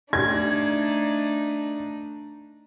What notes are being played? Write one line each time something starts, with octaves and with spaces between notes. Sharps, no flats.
A3 D4 D#4 G#6